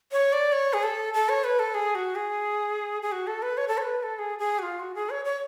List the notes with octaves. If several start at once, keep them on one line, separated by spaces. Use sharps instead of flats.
C#5
D5
C#5
G#4
A4
A4
C#5
B4
A4
G#4
F#4
G#4
G#4
F#4
A4
B4
C#5
A4
C#5
B4
B4
A4
G#4
G#4
F#4
F4
F#4
G#4
C#5
C#5